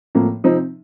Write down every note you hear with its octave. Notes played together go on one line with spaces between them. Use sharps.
A2 F3 A#3
C3 F3 C4 D#4